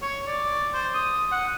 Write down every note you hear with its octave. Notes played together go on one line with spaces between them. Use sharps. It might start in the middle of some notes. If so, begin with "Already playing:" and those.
C#5
D5
C5
D#6
F#5